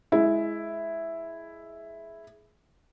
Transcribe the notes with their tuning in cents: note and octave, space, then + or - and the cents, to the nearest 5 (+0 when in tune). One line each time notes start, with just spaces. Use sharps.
G#3 +20 E4 +0